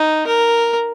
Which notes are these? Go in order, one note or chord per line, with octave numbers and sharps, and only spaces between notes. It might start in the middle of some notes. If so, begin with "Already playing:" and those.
Already playing: D#4
A#4